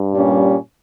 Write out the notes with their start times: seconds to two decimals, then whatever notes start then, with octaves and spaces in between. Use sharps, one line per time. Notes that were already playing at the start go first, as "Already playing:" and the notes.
Already playing: G2
0.12 A#2 G3 C#4